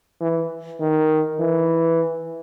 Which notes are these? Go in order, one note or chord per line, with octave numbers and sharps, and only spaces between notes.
E3
D#3
E3